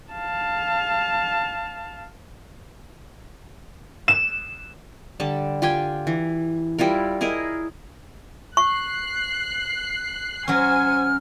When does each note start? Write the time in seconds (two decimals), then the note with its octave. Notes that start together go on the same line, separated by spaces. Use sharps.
0.13 F5 A5
4.08 E7
5.20 D3 G3 A5
5.62 F4 G4 G5 G#5
6.07 E3
6.79 G3 E4 F4 A#4
7.21 E4 G#4 A#4 D#5
8.57 C#6 F#6 C7
10.48 F#3 C#4 C5 G#5 F6